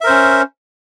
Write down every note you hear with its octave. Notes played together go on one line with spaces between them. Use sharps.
C#4 A#4 C5 E5